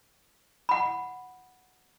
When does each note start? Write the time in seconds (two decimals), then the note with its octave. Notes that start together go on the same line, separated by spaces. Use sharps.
0.69 F#5 B5